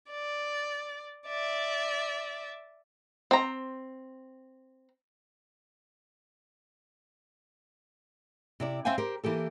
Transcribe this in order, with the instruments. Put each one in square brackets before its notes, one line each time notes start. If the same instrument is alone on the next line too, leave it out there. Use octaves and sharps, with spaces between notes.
[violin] D5
D5 E5
[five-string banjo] C4 A#5
[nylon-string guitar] C3 E4 D5
C4 E5 F5 G5 G#5
G4 A#4 C5
E3 A#3 G4 A4